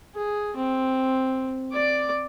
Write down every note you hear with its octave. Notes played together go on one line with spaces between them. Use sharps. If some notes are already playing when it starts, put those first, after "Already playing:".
G#4
C4
D5 D6